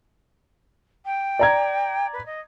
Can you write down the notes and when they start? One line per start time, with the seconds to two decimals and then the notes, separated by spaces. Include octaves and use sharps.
1.05 G5
1.39 D5 A#5 G#6
2.13 B4
2.26 D#5